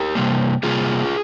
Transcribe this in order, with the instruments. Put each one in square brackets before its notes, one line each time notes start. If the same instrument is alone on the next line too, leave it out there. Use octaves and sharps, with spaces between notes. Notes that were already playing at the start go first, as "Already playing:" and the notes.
Already playing: [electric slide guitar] G4 A#4
C3 G3 A#3
C3 G3 A#3 F4 G#4